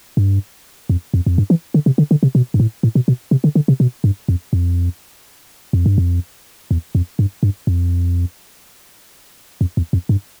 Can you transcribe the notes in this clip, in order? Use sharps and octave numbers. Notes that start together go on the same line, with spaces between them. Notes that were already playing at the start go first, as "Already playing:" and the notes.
G2
F2
F2
F2
G2
E3
D3
C3
D3
D3
C3
B2
G2
A2
A2
B2
B2
C3
D3
D3
C3
B2
G2
F2
F2
F2
G2
F2
E2
F2
G2
G2
F2
F2
E2
F2
G2